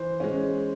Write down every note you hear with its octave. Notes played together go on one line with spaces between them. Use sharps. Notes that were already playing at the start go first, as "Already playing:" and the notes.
Already playing: E3 C5
G#3 C#4